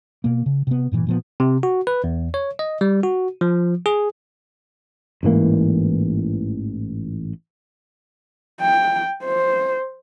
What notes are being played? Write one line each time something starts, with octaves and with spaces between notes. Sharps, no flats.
B2 A#3
C#3
C3 B3
G2 A#2 C#3 E3
A#2 F3 B3
C3
F#4
B4
E2
C#5
D#5
G3
F#4
F3
G#4
A1 G#2 E3 A#3
G5
C5